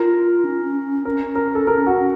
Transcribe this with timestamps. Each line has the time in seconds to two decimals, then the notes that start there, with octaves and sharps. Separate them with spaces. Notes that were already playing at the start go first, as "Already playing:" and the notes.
Already playing: F4 A#4
0.44 C#4
1.05 C#4 A#4
1.35 A#4
1.55 A4
1.67 A#4
1.87 F#4